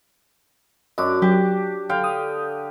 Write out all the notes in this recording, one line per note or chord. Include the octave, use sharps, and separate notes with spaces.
F#2 D4 D#5 D6
F#3 G4 A5
D3 F5 G5
D#6